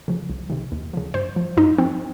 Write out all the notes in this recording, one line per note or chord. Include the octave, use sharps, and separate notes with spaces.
C#3 F3
C2
C3 D#3
D#2
C#3 F3
G2 C5
F3
G2 D#4
F3 C4